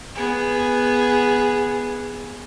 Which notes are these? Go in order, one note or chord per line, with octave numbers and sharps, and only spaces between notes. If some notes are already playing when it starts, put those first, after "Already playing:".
B3 G#4